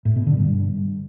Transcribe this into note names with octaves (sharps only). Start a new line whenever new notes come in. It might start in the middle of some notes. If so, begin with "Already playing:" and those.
A2
B2
D3
G2